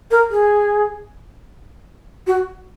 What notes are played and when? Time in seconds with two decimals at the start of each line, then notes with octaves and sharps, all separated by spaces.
0.11 A#4
0.30 G#4
2.27 F#4